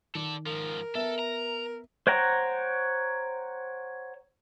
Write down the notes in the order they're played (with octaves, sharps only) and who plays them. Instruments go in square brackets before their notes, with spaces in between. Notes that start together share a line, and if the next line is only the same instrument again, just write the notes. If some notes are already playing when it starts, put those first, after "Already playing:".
[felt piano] D#3 [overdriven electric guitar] A4 D5
[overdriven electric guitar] G#2 F3 [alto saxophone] A#4
[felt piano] B3 E5 [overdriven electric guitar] A4
[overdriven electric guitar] A#5
[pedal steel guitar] C5 C#5 F#5 G5 A#5